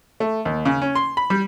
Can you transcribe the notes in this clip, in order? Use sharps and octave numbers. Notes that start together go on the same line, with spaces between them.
A3
D#2
C#3
C#4
C6
B5
G3